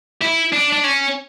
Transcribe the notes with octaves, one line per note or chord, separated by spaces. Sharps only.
E4
D4
D4
C#4